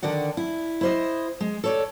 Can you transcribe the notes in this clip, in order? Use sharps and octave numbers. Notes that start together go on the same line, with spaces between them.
D3 D#3 D5 F#5
E4
E4 C5 D#5
G#3
A4 C#5 D5